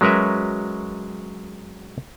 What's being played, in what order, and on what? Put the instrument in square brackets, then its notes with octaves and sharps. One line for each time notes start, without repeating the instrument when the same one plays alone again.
[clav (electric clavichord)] F#3 G#3 C#4 A#4 B4 E5